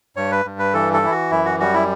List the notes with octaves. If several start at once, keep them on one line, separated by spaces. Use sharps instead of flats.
G2 C#5
B4
G2
B4
E3 A4
A4
E3 E4
F#4
F#2 E4
F#4
G3 F#4
E4